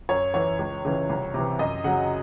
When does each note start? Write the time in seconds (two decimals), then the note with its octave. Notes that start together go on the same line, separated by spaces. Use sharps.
0.09 F#2 C#5
0.34 E3 C#5
0.59 C#2
0.85 C#3 E3
1.09 C2
1.34 C3 E3
1.59 F#2 D#5
1.84 C#3 F#3 F#5